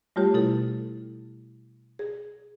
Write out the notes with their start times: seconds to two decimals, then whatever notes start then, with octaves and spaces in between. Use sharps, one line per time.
0.16 G3 A3 F4 G4 C#5
0.34 B2 E4 A4
1.99 G#4